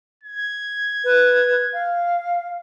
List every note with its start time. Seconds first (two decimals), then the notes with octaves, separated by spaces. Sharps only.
0.23 G#6
1.04 B4
1.73 F5